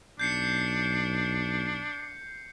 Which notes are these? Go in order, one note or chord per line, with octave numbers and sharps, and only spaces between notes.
B1 D4 G6 C7 C#7